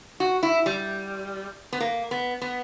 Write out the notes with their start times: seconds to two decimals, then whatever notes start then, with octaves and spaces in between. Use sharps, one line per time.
0.20 F#4
0.43 E4
0.66 G3
1.73 B3
1.80 A#3
2.11 B3
2.42 B3